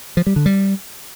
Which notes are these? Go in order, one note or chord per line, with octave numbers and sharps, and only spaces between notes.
F3
G3
D3
G3